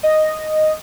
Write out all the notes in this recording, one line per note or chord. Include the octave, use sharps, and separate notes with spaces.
D#5